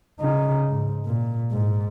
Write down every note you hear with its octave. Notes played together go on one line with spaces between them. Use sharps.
C#3 D#4
G#2
A#2
G#2